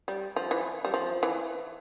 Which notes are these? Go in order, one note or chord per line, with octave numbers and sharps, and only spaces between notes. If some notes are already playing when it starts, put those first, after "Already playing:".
G3
F3
E3
G3
F3
E3